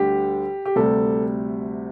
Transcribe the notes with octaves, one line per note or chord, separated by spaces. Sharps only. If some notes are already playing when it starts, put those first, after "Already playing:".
Already playing: D2 D3 G3 G4
G4
D2 C3 G3 A4